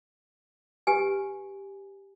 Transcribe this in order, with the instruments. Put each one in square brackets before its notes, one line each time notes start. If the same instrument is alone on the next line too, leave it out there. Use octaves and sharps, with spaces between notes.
[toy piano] G4 B4 G#5